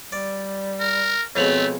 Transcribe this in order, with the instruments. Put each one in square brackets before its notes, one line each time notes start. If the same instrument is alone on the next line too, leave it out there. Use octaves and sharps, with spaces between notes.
[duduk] G3 [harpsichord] D5
[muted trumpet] A#4
[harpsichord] F2 B2 G#3 [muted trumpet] A3 [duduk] C4 [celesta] C#5 F7 F#7